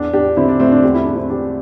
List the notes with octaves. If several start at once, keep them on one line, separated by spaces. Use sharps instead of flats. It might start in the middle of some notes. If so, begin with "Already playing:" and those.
Already playing: E2 D4
E2 D4 G4
D3 C4 E4
D4
A3 C4
D4
E2 G4
E4
E2 D4
C4 E4
D3 D4 G4